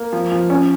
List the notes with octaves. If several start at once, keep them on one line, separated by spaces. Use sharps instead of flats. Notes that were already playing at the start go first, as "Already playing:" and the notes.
Already playing: A#3
F3
F3
C#4